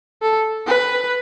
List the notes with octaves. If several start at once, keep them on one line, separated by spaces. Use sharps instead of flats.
A4
B4